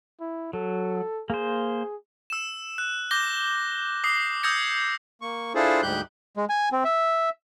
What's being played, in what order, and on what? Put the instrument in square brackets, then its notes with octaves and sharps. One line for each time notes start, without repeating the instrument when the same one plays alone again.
[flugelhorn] E4
[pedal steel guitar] F#3 [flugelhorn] A4
[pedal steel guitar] A#3 C5 [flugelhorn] G#4
[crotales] E6 E7
F#6
D6 G6 A#6 G7
D6 D#6 C7
D#6 E6 G6 G#6 A#6 C#7
[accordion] A#3 C#6
D4 E4 F4 G#4 A4 C5
D2 G#2 G3 G4 F#6 G6
[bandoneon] G#3
G#5
C4
E5